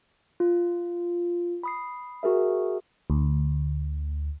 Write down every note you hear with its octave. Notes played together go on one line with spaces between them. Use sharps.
F4
B5 D#6 C7
F#4 G#4 A#4 E5
D2